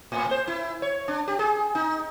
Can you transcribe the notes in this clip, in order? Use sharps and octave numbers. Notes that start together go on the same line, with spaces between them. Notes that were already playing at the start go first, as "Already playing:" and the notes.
A2
C5
E4
C#5
D4
G4
G#4
D#4